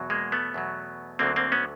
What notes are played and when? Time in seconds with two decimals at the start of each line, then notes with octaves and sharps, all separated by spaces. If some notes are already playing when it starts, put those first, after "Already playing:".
Already playing: E2 B2 F#3
0.10 G#3 A#3
0.32 A3 B3
0.54 E2 B2 F#3
1.19 D2 D3 F#3 A#3 C4
1.36 A#3 C4
1.52 B3 C#4